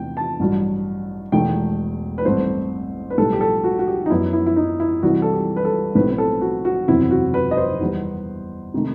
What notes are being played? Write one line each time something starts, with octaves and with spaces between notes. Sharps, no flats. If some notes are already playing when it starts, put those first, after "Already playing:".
Already playing: E2 C3 E3 A3 G5
A5
A1 G2 F#3
E1 E2 D#3 A3 G5
B4
A1 G2 D#3 A3 C4 C5
B4
B1 A2 G3 A4
G4
A4
F#4
F#4
G4
D#4
F#2 F#3 B3 E4
E4
E4
D#4
E4
C2 C3 E3 F#4
A4
G4
B4
A4
B1 A2 G3 C4 B4
B4
A4
F#4
F#4
F#1 E2 C3 F#3 C4 E4
F#4
B4
D#5
C5
E2 D#3 G3 B3
C3 D#3 A3